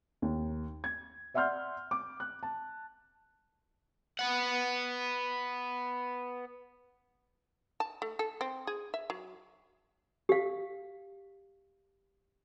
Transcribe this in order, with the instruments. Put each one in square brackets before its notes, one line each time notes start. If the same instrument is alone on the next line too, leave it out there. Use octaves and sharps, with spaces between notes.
[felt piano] D#2
G#6
D5 E5 F#5 C6 F6 G6
D6
F#6
A5
[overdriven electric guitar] B3 F#5
[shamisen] A5
A3
A4
C4
G#4
E5
F#3
[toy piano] G4 F5